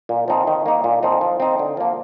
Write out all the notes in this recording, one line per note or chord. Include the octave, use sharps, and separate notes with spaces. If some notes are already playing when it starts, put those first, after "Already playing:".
A#2
F3 C4 D#4
D#3
A#3 D#4
A#2
F3 C4 D#4
F3
C4 D#4
D3
F3 A#3